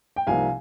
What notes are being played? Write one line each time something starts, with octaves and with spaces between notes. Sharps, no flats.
G5
C2 C3 F3 A#3 D#4 F5 G#5